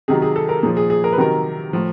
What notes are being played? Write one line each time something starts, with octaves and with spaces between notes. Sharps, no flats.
C3 D#3 F#3 G#4
G#4
A4
A#4
A#2 F3 G#4
G#4
G#4
A#4
B4
C3 D#3 F#3 A#4
A2 F3